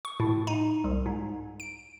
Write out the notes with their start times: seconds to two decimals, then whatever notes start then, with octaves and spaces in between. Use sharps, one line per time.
0.05 C#6
0.20 A2
0.47 D#4
0.84 C2
1.06 G#2
1.60 D7